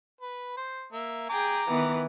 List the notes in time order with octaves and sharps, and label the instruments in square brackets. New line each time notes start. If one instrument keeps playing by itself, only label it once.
[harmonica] B4
C5
A#3 E5
[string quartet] G#4 G5 [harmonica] A#5 D6
[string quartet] D#3 E3 B3